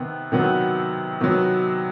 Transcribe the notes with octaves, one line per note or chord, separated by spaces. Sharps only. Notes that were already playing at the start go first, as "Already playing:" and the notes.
Already playing: C3 D#3 B3
C3 D#3 F#3 B3
C3 D#3 F#3 B3